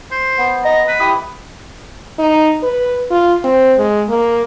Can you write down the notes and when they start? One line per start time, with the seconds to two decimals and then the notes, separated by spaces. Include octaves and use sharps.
0.11 C5
0.38 B3
0.65 D#5 A#5
0.88 B4
1.00 E4 G4 D#6
2.19 D#4
2.63 B4
3.10 F4
3.44 C4
3.78 G#3
4.09 A#3